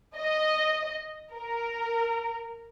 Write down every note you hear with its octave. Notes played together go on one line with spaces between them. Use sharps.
D#5
A#4